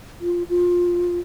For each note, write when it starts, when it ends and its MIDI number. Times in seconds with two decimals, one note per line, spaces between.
0.21 0.43 65
0.49 1.20 65